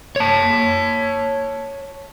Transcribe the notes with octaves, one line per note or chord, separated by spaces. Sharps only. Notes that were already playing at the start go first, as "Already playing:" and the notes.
C#5 A5